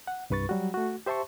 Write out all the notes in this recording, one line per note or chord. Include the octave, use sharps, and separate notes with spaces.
F#5
C2 G2 B4 C#6 A6
F#3 G3 F#4
A3 F#4
G4 C5 E5 A5 C6 C#6